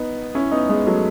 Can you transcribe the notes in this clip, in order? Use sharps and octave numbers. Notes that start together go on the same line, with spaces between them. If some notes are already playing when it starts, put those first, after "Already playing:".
Already playing: B3 D#4
C#4 E4
B3 D#4
G#3 B3
F#3 A3